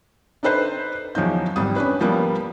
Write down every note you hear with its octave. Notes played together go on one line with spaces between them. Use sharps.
D4 D#4 A4 B4 C5
E2 F3 F#3 D#4 G6
G#1 G3 D#6
C#4 D4 B4
F3 G3 A#3 B3